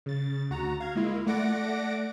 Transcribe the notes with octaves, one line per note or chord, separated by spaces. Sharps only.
C#3 A6
D2 F#4 A#5
F5 G#6
G#3 A#3 E4 F4
A3 D5 F#5 D6 A#6 D7